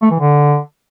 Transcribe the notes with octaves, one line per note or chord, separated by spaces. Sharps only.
A3
E3
D3